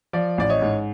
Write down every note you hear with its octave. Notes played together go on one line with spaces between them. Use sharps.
F3 D5
A1 D5
C#5 D#5
G#2